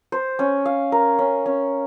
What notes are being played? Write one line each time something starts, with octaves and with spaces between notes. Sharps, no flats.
C5
C#4
F5
A#4
C#4
C#4